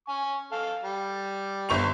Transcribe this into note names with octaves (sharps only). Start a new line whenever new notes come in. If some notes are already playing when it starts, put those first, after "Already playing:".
G#5 C#6
A4 F5
G3
G1 C#6 F7